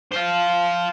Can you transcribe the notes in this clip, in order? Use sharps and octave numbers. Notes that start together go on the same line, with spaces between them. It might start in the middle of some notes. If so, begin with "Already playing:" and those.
C5 F5